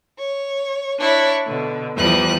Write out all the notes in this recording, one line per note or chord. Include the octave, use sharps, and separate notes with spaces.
C#5
D4 E4 C#5
B2 D3
E2 E3 F3 G3 D#6 F#6